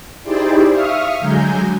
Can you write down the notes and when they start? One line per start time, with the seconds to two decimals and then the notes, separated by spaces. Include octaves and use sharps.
0.23 D#4 E4 G4 G#4 C5 D5
0.71 E5 F5 C#6 D#6 F6
1.20 D3 F#3 G#3 G#5 A#5 G6